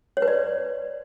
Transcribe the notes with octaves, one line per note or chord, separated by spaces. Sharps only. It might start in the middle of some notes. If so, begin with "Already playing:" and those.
C#5
B4
D5